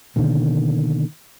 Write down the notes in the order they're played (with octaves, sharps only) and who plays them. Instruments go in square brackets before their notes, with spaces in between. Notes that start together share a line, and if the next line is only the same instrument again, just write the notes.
[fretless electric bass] B2 D3 D#3 A#3